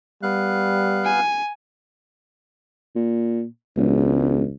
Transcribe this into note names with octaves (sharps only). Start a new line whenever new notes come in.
G3 B3 F5 F#6
G#5
A#2
E1 C#2